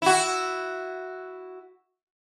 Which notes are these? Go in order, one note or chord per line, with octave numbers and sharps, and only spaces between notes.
E4 F#4